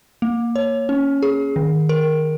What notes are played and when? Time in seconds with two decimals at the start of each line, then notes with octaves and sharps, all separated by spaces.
0.22 A#3
0.56 C#5
0.89 C#4
1.22 G#4
1.56 D#3
1.89 A#4